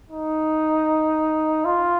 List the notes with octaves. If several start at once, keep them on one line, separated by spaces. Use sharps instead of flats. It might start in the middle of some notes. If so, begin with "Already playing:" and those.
D#4
F4